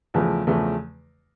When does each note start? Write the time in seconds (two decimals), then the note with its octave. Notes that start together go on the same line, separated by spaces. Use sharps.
0.14 E2 C#3 F3 A3
0.47 E2 C#3 F3 A3